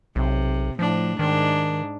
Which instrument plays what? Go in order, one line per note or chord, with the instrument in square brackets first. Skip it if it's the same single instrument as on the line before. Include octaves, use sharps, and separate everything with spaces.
[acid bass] B1 [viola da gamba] C3
[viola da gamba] A2 D4 [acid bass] F3
[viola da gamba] G#2 D4 [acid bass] D#3